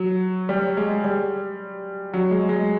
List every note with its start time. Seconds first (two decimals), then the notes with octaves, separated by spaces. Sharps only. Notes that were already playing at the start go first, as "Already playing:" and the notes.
Already playing: F#3
0.49 G3
0.77 G#3
1.04 G3
2.13 F#3
2.31 G#3
2.49 G#3